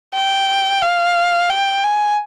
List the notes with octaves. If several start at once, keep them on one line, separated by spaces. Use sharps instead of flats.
G5
F5
G5
G#5